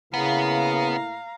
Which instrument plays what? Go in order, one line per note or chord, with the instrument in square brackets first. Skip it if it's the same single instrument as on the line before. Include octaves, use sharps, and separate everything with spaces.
[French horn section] A2 A#3 E4 [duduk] C#3 [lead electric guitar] B3 [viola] F5 A#5